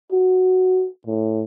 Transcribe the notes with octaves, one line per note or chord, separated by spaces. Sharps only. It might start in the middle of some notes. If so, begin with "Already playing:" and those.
F#4
A2